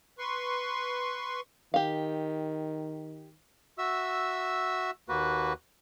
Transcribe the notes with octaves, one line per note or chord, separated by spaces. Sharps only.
B4 C6 C#6
D#3 G4 F5
F#4 E5 E6
D#2 A#3 F#4 B4